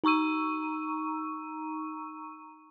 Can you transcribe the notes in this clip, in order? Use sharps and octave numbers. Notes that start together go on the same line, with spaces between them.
D#4 A#5 C#6 E6 D#7